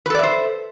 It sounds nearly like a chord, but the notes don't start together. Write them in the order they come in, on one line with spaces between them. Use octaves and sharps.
B4 A4 D5 E5 C5